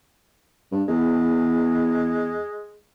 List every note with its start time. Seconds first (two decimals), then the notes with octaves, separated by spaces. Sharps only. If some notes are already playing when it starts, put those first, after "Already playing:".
0.72 G2
0.88 E2 G#3